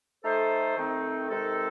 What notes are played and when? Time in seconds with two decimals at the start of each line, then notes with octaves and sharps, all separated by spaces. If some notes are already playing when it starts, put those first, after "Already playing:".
0.22 A3 D#4 A4 C5
0.76 D#3 A3 C4 D#4
1.29 C3 D#3 G#3 D#4 A4